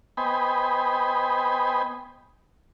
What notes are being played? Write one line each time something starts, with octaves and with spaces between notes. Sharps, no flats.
B3 C5 D#5 G5 G#5 B5